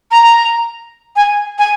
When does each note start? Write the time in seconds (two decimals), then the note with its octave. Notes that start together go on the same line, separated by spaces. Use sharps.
0.11 A#5
1.16 G#5
1.59 G#5